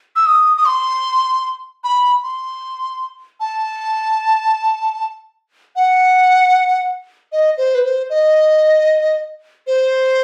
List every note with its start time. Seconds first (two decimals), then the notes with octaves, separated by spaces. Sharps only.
0.16 E6
0.26 D#6
0.57 D#6
0.66 C6
1.84 B5
2.23 C6
3.40 A5
5.76 F#5
7.32 D#5
7.58 C5
7.75 B4
7.84 C5
8.10 D#5
9.67 C5